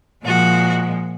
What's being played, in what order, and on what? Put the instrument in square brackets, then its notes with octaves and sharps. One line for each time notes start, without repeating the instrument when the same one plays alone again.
[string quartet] A#2 F3 G#3 F#4